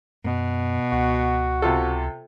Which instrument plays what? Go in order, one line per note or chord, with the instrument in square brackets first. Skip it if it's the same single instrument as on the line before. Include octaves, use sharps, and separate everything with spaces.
[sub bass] F#2 [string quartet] B2
[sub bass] C#2 [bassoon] F#4
[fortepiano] C3 F4 A4